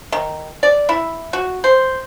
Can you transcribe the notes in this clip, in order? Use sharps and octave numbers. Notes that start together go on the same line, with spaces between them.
D#3
D5
E4
F#4
C5